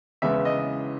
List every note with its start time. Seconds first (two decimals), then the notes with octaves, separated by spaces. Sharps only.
0.22 E2 C#3 G#3 B3 E5
0.45 D#5